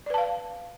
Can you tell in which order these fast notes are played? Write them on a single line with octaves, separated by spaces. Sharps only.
D5 B4 A5 F5